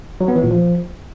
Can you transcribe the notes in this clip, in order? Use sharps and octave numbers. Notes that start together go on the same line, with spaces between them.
F#3
B3
E3
A#2
F3